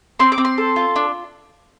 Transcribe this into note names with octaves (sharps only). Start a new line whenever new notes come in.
C4 C6
D6
C4
C6
A4
F4
D4